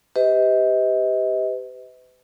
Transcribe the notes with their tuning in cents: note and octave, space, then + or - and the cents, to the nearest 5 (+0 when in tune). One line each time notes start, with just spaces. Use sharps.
G4 +0 B4 +40 D#5 +35